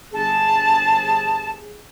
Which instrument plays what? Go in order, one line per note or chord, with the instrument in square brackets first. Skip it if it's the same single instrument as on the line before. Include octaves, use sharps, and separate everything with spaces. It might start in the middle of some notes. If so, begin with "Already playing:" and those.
[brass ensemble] G1 G#4 [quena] A5